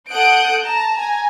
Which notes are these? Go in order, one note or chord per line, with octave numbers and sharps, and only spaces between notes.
A4 F#5 D#6 F#6 G6 D7
A5 A#5
G#5 A#5